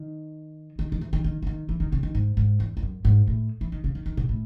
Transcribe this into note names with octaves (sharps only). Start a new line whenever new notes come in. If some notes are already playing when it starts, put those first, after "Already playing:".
Already playing: D#3
D#3
D#3
E3
D#3
D#3
E3
D#3
E3
D#3
C#3
D#3
G#2
G#2
E2
E2
F#2
G#2
A2
E3
D#3
C#3
D#3
D#3
B2
A2